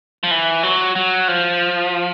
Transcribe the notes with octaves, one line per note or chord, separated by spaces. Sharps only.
F3
E3
F#3
F#3
F3